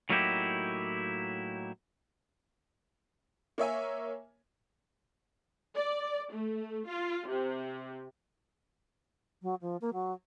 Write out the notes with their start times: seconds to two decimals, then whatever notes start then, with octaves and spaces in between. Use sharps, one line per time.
0.10 A2 F#3 A#3 D#4 E4 G4
3.58 A#3 C#5 E5 G#5
5.76 D5
6.33 A3
6.88 F4
7.29 C3
9.42 F#3
9.61 F3
9.81 A#3
9.94 F#3